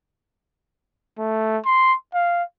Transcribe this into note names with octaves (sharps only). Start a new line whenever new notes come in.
A3
C6
F5